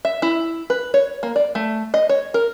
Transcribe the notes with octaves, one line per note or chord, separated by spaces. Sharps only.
E5
E4
B4
C#5
A#3
D5
A3
D#5
C#5
A#4